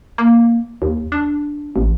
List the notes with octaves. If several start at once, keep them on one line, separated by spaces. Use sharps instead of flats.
A#3
D#2
D4
A1